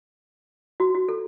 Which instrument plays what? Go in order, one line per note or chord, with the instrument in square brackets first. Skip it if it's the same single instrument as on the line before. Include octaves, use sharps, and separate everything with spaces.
[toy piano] F#4
F#4
A4